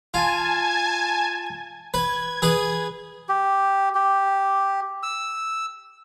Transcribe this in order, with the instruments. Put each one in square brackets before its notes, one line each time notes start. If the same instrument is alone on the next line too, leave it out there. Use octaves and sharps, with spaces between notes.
[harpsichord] F4 [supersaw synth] G#5 A5 G#6
[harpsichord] B4 [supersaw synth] G#6
[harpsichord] G#4 B4 D#6
[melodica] G4
G4
E6